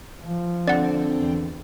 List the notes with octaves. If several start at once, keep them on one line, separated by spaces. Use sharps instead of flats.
F3
D3 C4 D5 F#5
E2